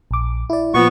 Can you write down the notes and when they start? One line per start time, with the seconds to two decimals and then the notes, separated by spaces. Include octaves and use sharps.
0.11 A#1 D6
0.50 E4 D5
0.74 A#2 F3 B3 C#6